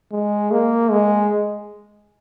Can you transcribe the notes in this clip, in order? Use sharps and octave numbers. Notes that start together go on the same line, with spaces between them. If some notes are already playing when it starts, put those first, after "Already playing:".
G#3
A#3
G#3